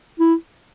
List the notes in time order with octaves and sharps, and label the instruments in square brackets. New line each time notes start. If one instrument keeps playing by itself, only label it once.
[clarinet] E4